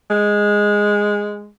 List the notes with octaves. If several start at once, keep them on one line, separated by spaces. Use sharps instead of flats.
G#3